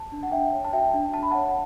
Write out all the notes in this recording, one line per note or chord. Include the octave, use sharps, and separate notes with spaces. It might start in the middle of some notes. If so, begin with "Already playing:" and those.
Already playing: A5
D4
F#5
D4 E5 G5
C#5
A5
F#4 E5 G5
D4
D4 A5
B5
C#5 F#5 A5